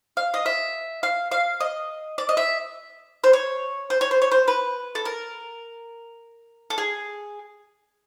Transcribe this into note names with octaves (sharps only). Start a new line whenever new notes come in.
F5
D#5
E5
F5
F5
D#5
D5
D#5
E5
C5
C#5
C5
C#5
C5
C#5
C5
B4
A4
A#4
A4
G#4